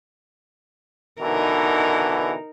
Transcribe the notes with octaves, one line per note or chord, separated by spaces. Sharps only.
B2 D3 E3 D#4 A#4